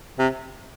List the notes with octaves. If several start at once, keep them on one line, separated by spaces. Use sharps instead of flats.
C3